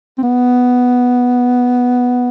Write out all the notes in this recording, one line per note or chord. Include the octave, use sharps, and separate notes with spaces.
C4
B3